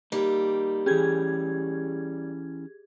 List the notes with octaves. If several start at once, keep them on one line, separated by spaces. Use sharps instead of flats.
G3 A#3 D#4
E3 C#4 G4 G#4 G#6